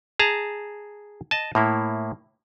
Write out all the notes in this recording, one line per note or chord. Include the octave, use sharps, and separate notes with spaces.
G#4 A5 A#5
D#5 A5
A2 A#3 E4